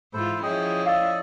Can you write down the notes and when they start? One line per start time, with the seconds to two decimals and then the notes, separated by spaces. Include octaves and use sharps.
0.13 G#2 E3 E4 F4 A4 C5
0.43 F3 C#4 E4 G#4 D#5 G5
0.86 A4 D5 D#5 F5